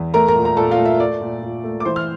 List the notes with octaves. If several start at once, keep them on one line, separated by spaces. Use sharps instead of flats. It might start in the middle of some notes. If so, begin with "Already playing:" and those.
Already playing: E2
A3 A#4 A#5
A#4 A#5
A#2
A#5
A#2 A4 A5
F4 F5
A3
E5
A3 D5
A#2
A#2
A3
D6
E3 C5 C6
F6